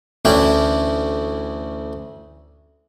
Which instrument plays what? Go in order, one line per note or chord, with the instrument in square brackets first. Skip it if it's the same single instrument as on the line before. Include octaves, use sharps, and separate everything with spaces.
[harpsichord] D2 E3 C#4 D4 E4 G5